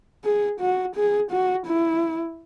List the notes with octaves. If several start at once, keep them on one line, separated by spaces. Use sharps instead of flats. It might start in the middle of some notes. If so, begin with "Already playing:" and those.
G#4
F#4
G#4
F#4
E4